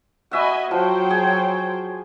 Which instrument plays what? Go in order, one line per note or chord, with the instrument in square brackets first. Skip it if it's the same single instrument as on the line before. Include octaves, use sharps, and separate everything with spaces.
[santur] F#4 E5 F#5 [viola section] D#5 G#5 B5
[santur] F3 [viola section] F#3 C5 G5
[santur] G#4